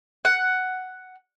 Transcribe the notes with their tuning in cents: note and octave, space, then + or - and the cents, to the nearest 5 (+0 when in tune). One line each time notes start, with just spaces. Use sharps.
F#5 +5